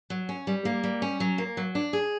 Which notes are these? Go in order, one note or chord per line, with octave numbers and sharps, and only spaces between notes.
F#3
C#4
G3
A#3
G3
C#4
F#3
A#3
F#3
D4
G#4